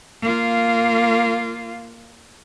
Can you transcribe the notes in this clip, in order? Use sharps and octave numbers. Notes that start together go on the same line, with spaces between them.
A#3 F4